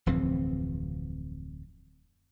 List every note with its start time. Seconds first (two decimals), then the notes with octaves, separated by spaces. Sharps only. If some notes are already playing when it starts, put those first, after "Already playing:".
0.06 D1 F2 E3 C4